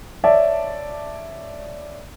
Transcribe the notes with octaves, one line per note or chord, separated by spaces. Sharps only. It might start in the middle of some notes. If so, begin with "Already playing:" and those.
C#5 D5 E5 A5